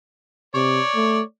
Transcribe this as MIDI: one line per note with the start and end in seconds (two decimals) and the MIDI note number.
0.55 0.80 48
0.55 1.20 73
0.55 1.20 74
0.96 1.22 57